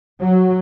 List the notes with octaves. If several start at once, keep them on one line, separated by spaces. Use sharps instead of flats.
F#3